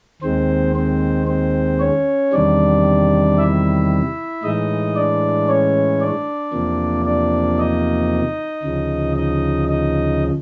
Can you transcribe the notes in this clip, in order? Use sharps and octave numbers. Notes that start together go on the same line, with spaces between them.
D#2 D#3 G#3 C4 C5
C4 C5
C4 C5
C#4 C#5
E2 C3 D#3 G3 D4 D5
E4 E5
A2 E3 G#3 D#4 D#5
D4 D5
C#4 C#5
D4 D5
E2 C3 F3 A#3
D4 D5
D#4 D#5
D2 C#3 F3
D#4 D#5
D#4 D#5